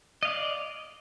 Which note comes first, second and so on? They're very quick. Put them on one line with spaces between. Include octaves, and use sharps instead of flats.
D#5 F5 D5